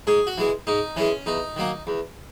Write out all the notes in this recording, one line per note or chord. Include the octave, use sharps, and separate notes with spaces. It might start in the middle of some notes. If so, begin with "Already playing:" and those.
G#2 G#4
F#4
E3 G#3
G#2 D#4
E3 G#3 C#4
E2 D#4
D#3 F#3 A#3
E2